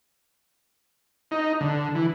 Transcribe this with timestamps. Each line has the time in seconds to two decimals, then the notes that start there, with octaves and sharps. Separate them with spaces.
1.31 D#4
1.61 D3
1.95 E3